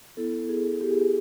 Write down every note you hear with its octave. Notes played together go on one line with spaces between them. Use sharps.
B3 E4 A4
G#4
G4
G#4
G4